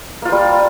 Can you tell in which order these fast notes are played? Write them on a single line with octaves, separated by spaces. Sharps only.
A#3 F4 C5 G3